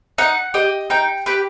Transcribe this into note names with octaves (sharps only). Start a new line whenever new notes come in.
D#4 F#5
G4 D#5
D#4 G5
G4 B4